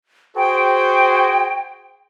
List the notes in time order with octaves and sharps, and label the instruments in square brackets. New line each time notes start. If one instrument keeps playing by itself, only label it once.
[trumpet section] F#4 G#4 C5 [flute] G5